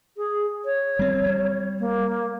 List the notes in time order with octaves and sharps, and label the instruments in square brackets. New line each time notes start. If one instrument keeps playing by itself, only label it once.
[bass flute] G#4
C#5
[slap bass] G3 C4
G3
[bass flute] A#3